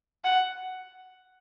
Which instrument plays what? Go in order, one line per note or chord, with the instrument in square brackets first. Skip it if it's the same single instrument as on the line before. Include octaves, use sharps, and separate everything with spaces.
[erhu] F#5